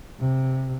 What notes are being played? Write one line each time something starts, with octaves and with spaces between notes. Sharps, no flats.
C3